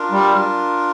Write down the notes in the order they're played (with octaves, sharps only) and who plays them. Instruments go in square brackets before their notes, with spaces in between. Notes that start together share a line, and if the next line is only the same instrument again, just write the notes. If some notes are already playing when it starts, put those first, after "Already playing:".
Already playing: [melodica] D4 F4 A#4
[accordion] G3